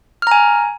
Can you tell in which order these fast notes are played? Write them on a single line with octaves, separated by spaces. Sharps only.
F6 A#5 G#5